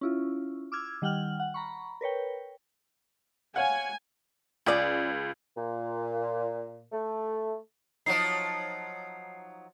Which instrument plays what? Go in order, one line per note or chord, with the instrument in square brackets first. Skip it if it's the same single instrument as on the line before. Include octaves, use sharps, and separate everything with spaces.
[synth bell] C#4 E4 F4
D6 E6 F6 G#6
D#3 G3 F#5 G5 F6 F#7
F#5
A#5 B5 C#6
A#4 B4 C#5 G5
[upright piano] C#5 F5 F#5 [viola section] G#5
[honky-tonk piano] C#2 [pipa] C#4 G#4 D5
[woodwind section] A#2
A3
[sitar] F3 F#3 D#4 [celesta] C7